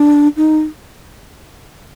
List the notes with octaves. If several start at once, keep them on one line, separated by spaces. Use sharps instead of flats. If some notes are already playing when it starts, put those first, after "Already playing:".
Already playing: D4
D#4